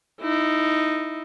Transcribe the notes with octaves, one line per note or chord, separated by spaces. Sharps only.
D#4 E4